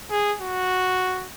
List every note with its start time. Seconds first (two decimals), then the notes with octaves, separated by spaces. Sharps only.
0.10 G#4
0.41 F#4